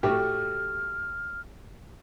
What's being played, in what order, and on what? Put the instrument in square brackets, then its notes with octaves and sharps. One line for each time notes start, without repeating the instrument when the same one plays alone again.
[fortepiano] A2 A3 F#4 [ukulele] G4 [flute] F6